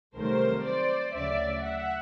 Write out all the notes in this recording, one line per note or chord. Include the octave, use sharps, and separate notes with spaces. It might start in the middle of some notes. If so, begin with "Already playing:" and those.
C2 C3 D#3 F#3 A3 A#4 C5
C5 D5
D2 C#3 F#3 D5 E5
E5 F#5